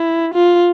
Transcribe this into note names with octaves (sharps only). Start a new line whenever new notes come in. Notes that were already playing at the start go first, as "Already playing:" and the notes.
Already playing: E4
F4